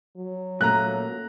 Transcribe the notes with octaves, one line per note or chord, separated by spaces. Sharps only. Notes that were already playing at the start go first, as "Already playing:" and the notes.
F#3
A#2 A3 A#3 C#4 A#5 F#6